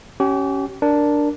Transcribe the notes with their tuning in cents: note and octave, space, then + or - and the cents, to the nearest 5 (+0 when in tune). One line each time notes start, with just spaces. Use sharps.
C#4 +0 G4 -35
D4 +0 A#4 +0